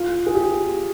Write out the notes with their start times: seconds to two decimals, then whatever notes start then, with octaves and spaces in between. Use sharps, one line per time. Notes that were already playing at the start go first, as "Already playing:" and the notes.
Already playing: F4
0.26 G#4
0.35 G4